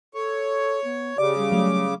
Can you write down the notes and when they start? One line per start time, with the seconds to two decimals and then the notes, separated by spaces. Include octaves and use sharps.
0.14 A4 C#5
0.85 B3
1.18 C#3 G4 D5 D6
1.38 G3
1.52 F#3 A3